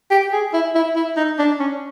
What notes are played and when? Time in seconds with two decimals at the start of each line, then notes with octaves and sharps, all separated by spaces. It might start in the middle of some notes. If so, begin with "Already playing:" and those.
0.11 G4
0.32 G#4
0.53 E4
0.75 E4
0.96 E4
1.17 D#4
1.39 D4
1.59 C#4